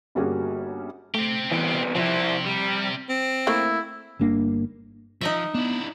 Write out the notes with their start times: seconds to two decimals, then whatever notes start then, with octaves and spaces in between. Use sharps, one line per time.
0.15 G1 G3 A#3 C#4 F#4 G#4
1.14 A3 C4 G4
1.51 C2 E3 B3
1.95 C3 F3 C4 E4 G4
2.46 G3
3.09 C4
3.47 A3 A#3 E4
4.19 G1 G2 A#3 D4
5.21 F3 D#4 D#5 E5
5.55 B3 D4 E4